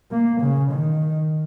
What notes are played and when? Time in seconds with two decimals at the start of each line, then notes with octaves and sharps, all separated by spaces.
0.11 A#3
0.41 C#3
0.72 D#3